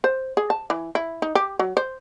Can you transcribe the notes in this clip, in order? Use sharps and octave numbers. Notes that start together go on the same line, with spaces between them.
C5
G#4
A5
E3
E4
D#4
G4
F#3
C5